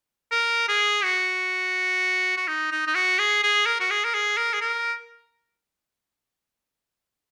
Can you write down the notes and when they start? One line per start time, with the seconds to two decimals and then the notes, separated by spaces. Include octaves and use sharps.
0.32 A#4
0.69 G#4
1.03 F#4
2.37 F#4
2.48 D#4
2.72 D#4
2.87 D#4
2.95 F#4
3.19 G#4
3.43 G#4
3.66 A#4
3.80 F#4
3.90 G#4
4.05 A#4
4.14 G#4
4.37 A#4
4.53 G#4
4.61 A#4